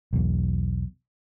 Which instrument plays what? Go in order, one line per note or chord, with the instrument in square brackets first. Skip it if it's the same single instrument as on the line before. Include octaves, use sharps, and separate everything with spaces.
[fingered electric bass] B1 E2